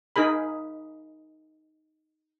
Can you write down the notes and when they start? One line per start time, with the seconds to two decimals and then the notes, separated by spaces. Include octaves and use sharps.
0.16 D#4 G#4 A#4 B5